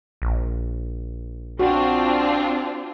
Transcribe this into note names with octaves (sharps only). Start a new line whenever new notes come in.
A#1
C4 D4 F4 F#4